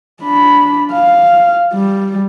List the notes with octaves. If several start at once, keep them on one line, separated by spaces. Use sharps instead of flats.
D4 B5
F5
G3